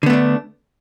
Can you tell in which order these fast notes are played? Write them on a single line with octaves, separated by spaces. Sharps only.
D3 B3 A3 D4